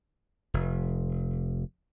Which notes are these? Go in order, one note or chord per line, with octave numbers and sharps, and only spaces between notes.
F1